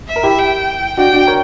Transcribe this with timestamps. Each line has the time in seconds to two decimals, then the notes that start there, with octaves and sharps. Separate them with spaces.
0.09 E5
0.16 A#4
0.23 E4 G4
0.38 G5
0.97 D4 F#4 G5
1.13 D4 F#4
1.27 A#4 C#5